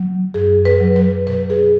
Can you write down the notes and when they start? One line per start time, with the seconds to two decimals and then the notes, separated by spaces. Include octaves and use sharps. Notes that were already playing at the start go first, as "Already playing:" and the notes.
Already playing: F#3
0.34 F#2 G#4
0.65 B4
0.81 F#3
0.96 B4
1.27 B2 B4
1.50 G#4